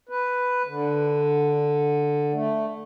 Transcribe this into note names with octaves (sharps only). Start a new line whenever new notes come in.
B4
D3
A3